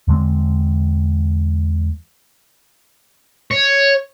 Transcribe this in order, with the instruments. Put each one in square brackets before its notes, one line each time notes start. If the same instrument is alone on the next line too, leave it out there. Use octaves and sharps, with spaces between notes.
[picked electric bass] E2 D3 G#3 C4
[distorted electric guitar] C#5